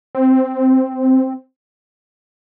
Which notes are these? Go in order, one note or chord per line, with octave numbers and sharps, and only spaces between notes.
C4